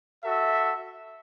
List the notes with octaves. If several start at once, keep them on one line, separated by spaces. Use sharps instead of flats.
F#4 A4 E5